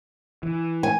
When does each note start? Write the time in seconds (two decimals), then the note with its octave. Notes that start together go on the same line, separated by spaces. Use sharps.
0.43 E3
0.83 G#5